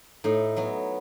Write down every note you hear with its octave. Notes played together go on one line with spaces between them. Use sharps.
A2 D#4
F#3 B3